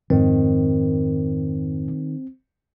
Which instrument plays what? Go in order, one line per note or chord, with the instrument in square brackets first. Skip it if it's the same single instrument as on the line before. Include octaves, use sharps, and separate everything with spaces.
[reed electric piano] F2 G#2 [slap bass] D#3 [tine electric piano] C4